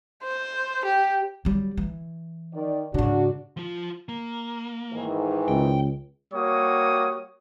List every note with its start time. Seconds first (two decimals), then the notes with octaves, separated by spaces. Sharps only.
0.24 C5
0.85 G4
1.45 F#3 G3
1.77 E3
2.54 D#3 D5
2.94 G#2 C#3 D4 F#4
3.57 F3 F4
4.09 A#3
4.93 G#2 D#3 E3
5.48 C#2 G5
6.33 G3 A#3 F#4 C#5 D#6